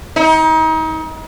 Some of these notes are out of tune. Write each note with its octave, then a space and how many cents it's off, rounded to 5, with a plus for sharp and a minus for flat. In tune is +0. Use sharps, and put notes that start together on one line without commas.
D#4 +35